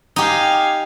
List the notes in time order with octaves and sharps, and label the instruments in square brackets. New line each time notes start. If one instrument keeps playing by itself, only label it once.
[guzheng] D#4 G4 [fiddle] F5 G#5